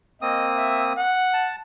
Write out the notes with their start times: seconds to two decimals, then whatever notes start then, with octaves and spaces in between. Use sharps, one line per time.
0.22 A#3 C4 D#5 D#6
0.57 E5
0.98 F#5
1.34 A5